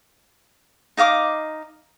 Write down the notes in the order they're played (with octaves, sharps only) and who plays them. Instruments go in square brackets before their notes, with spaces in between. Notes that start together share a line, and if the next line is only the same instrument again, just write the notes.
[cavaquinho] D#4 D#5 F5 D6